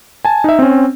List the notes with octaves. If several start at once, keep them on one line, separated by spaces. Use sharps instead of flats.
G#5 A5
D#4 E5
C4 C#4